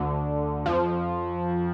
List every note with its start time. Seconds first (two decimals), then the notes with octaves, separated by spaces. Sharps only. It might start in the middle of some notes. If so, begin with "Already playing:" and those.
Already playing: D2 D3
0.65 F2 F3